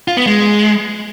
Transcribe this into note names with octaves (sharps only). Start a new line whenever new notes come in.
F4
B3
G#3